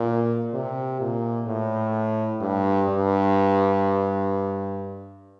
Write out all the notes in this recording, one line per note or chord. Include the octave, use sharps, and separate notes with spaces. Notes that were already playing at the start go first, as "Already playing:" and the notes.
Already playing: A#2
C3
A#2
A2
G2
G2